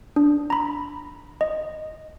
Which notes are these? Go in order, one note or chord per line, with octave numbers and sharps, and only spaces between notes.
D4
A#5 B5
D#5